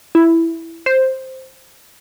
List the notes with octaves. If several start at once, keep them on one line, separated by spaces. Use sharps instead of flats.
E4
C5